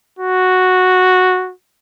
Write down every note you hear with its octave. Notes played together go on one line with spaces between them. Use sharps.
F#4